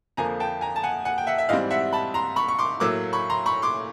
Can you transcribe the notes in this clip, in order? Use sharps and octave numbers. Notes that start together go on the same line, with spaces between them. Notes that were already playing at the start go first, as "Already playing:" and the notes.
F2 D3 F3 A#3 G#5 A#5
G5 A5
G#5 A#5
A5
F#5 G#5
F#5 G#5
G5
E5 F#5
E5
G#2 E3 G3 C4 D#5 F5
E5 F#5
A5 B5
A#5 C6
B5 C#6
C#6
C6 D6
A2 F#3 A#3 D6 E6
B5 C#6
A#5 C6
B5 C#6
C6 D6